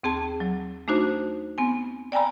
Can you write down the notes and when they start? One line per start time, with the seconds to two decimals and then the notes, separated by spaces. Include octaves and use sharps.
0.03 D#2 C4 G#4 A5
0.40 F#3
0.88 A3 D4 D#4 F#4 C5
1.58 B3 C4 G#5
2.12 D5 G5 G#5 A#5 B5